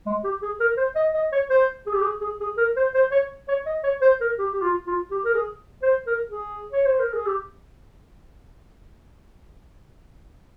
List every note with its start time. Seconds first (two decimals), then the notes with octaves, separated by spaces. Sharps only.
0.06 G#3
0.24 G4
0.42 G#4
0.60 A#4
0.77 C5
0.95 D#5
1.14 D#5
1.32 C#5
1.50 C5
1.86 G#4
1.94 G4
2.02 G#4
2.21 G#4
2.41 G#4
2.57 A#4
2.77 C5
2.94 C5
3.12 C#5
3.48 C#5
3.66 D#5
3.84 C#5
4.02 C5
4.21 A#4
4.38 G4
4.53 G4
4.62 F4
4.87 F4
5.11 G4
5.25 A#4
5.35 G#4
5.83 C5
6.07 A#4
6.30 G#4
6.72 C#5
6.86 C5
7.00 A#4
7.13 G#4
7.26 G4